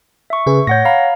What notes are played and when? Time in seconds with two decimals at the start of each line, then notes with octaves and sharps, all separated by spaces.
0.30 E5 C#6
0.46 C#3 G#4 B4
0.67 A2 C#5 F#5 G6 A#6
0.85 F5 A#5 B5